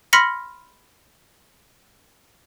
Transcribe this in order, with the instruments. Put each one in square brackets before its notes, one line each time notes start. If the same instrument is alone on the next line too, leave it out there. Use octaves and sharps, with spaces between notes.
[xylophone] B5 C6 F6 A#6 B6 C#7